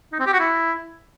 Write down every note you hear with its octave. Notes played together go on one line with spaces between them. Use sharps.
D#4
C4
G4
F#4
E4